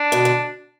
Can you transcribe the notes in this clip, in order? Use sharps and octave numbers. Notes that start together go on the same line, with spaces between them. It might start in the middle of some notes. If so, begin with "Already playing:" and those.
Already playing: D4
B2 D3
D3